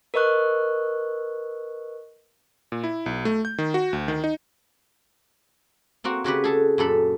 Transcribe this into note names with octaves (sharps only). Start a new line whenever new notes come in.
A#4 B4 D#5 C#6 F#6
A#2
E4
B1
A3
G6
D#3
F#4
D2
D#3
D#4
A#3 C4 F#4
C#3 F#4 G4 B4
G#4 A4 A5
F#2 A#2 A4 B5